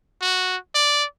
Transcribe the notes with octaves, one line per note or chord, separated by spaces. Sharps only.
F#4
D5